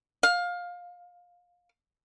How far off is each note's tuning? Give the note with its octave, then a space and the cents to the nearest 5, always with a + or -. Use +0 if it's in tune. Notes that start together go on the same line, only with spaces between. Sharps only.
F5 +20